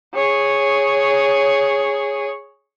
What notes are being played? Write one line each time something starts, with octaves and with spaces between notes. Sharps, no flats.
G#4 C#5